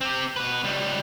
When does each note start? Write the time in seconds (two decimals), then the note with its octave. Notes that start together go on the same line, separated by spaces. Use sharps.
0.01 C4 G4
0.36 B2 B4
0.64 C#2 G3